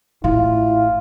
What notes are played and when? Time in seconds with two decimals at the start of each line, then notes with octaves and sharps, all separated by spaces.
0.24 A1 A2 E4 F4